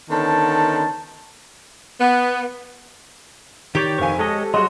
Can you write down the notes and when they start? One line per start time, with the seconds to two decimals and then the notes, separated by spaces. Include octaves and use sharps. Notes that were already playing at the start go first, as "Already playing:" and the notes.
0.10 D3 D#3 B3 C#4 A5
2.00 B3
3.75 D#3 G4 C#5 D5
3.99 F1 D#3 C5 F5 G#5 C#6
4.19 G#3 A4 C#5 D#5
4.54 F#3 G3 F#4 G#4 D#5 C6